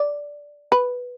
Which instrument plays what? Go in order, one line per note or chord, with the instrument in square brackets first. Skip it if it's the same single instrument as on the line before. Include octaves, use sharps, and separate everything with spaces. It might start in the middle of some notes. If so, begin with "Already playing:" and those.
Already playing: [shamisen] D5
B4